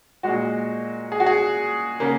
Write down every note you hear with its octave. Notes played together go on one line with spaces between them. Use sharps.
A#2 G#3 F#4
G#4
F#4
G#4
C#3 A#3